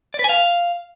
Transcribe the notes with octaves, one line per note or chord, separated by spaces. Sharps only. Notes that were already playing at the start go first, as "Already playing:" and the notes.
D5
B4
G#5
F5